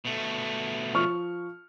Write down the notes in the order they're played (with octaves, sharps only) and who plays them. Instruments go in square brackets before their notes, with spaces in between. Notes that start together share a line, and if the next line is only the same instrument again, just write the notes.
[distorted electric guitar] B2 A3
[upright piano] F3 C#6 F6